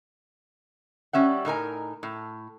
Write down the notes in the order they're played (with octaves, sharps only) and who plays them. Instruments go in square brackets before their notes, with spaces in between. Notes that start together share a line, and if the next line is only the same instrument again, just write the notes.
[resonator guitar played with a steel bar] G3 C#4 E5 F#5
A2 D#4 A#4 G#5
A2